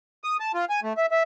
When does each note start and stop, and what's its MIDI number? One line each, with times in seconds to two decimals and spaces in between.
0.24 0.37 87
0.40 0.52 81
0.54 0.65 65
0.69 0.80 80
0.83 0.93 57
0.97 1.06 76
1.11 1.23 76